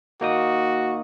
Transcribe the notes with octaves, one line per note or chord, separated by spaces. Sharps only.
A#3 D#4 F#4 D#6